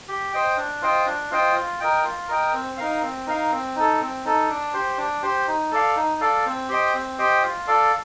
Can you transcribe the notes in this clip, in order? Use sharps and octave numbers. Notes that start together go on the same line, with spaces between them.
G4
C5 D#5 G5
D4
F4 C5 D#5 G5
D4
F4 C5 D#5 G5
F4
A#4 D#5 G5
F4
A#4 D#5 G5
C4
D#4 A#4 F5
C4
D#4 A#4 F5
C4
D#4 A4
C4
D#4 A4
D4
G4 C5
D4
G4 C5
D#4
A4 D5 F5
D#4
A4 D5 F5
C4
G4 C5 D#5 G5
C4
G4 C5 D#5 G5
F4
A4 D5 F5